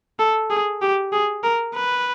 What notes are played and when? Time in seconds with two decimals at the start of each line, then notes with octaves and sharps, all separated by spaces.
0.19 A4
0.51 G#4
0.82 G4
1.13 G#4
1.43 A#4
1.75 B4